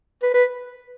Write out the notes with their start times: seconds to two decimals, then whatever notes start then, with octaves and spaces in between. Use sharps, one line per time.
0.22 B4
0.34 B4